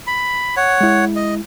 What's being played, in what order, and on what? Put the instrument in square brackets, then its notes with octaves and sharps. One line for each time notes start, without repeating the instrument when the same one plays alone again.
[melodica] B5
C#5 F#5
[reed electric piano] G#3 E4
[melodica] D#5